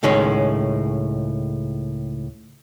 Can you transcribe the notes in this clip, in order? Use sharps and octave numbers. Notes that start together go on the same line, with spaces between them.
C#2 A2 D#3 G#3 C#4